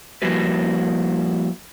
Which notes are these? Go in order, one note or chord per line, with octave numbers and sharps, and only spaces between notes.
F3 G3 A#3 E4 F#4 B4